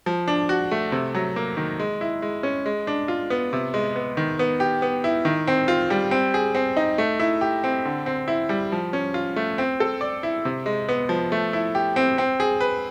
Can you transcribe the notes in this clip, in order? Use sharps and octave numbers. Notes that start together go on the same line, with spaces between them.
F3
D4
F#4
A3
C3
F#3
A#3
D#3
G#3
E4
G#3
C#4
G#3
D4
F4
B3
C3
G#3
B3
D#3
B3
G4
B3
E4
D#3
C4
F4
G3
C4
G#4
C4
D#4
A3
E4
G4
C4
D3
C4
E4
G3
F3
C#4
F4
A3
C4
A4
D5
E4
C3
G#3
B3
F3
A3
E4
G4
C4
C4
G#4
B4